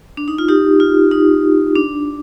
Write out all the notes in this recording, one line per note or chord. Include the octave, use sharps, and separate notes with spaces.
D4
D#4
F4
D#4 G4
F4
D#4
D4